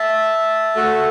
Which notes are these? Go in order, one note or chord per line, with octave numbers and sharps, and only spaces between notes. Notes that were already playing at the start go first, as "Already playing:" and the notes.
Already playing: E5 A5
A3 F#4 A4